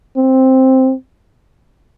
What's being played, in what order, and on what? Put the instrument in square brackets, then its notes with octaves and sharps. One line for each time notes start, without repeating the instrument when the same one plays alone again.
[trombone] C4